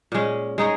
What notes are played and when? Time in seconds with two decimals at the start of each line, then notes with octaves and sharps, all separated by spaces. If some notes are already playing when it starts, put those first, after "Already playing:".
0.12 A#2 G#3 C#4
0.58 G#3 D#4 G#4 C#5